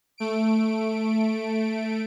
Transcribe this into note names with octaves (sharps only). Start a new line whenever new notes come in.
A3 D7